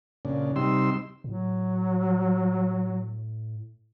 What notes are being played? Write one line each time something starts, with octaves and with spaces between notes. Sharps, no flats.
A#2 C#3 D4
C3 G3 D#4 C6 E6
A2 F#3